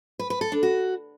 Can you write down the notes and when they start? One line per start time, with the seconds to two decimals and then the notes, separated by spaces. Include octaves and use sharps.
0.19 B4
0.30 B4
0.41 A4
0.52 D4
0.63 F#4